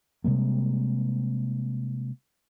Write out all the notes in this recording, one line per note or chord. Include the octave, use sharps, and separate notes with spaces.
C3 G3 G#3 A#3